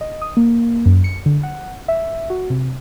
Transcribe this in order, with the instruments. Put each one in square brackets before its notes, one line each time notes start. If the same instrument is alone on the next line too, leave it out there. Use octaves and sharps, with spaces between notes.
[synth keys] D#5
D#6
A#3
F#2
C#7
D3
F#5
E5
F#4
C3